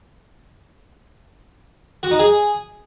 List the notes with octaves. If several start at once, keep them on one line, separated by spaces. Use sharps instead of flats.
F#4
D#4
G#4